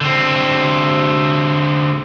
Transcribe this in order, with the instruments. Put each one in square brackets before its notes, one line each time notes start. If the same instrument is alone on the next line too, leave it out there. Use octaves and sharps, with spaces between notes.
[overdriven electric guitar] D3 C4